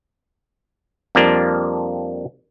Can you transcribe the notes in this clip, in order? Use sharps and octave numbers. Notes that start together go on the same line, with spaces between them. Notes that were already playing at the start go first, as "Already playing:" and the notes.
F2 F3 G3 A#3 D4